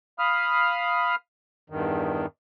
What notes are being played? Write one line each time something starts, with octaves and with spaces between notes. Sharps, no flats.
F5 B5 D#6 F6
E2 G2 D#3